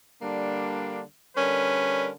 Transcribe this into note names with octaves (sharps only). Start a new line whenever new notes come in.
D3 G3 A#3 D4
D3 G3 C#4 A#4 B4